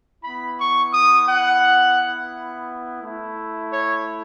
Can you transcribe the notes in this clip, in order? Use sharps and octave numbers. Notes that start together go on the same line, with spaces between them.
B3 E4 B5
C#6
D#6
F#5
A3 E4
C#5